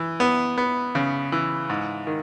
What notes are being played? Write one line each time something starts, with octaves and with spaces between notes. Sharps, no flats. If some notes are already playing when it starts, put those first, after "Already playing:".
Already playing: E3
B3
B3
C#3
E3
G#2
D#3